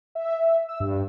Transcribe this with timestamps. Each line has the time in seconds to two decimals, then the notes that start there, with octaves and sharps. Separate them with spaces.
0.15 E5
0.69 E6
0.80 G2